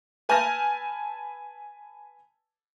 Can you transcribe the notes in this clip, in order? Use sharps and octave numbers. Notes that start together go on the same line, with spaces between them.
B4 G#5 A5 F6 G6 A#6